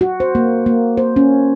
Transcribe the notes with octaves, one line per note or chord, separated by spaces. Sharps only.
F#4
C5
A#3
A#3
C5
C#4